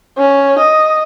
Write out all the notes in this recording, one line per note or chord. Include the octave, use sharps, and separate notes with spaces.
C#4
D#5